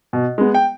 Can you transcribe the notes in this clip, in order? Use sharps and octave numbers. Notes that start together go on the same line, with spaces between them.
B2
G#3 B3
G5